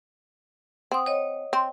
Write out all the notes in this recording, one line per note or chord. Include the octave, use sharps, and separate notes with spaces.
C4 F#5 D#6
C#5 D#5
C4